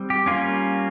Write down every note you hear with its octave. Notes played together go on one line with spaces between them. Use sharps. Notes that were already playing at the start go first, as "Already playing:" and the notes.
Already playing: G3 C4
G4
G3 A#3 C#4 F4